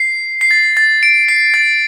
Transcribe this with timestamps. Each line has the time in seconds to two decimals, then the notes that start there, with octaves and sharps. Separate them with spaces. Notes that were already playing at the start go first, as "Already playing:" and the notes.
Already playing: C7
0.41 C7
0.51 A6
0.77 A6
1.03 D7
1.28 C7
1.54 A6